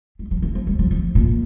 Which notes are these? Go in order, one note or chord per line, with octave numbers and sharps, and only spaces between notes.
G3
F3
E3
F3
G3
F3
F3
A#2